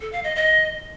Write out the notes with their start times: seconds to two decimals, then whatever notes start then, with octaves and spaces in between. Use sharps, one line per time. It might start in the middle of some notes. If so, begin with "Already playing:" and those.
0.01 A4
0.12 F5
0.24 D#5
0.36 D#5